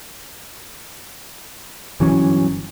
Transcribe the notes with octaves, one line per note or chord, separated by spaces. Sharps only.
G1 E3 F#3 C#4